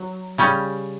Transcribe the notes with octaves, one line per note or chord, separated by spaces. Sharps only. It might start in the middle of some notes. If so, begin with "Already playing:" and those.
Already playing: F#3
C#3 G3 C#4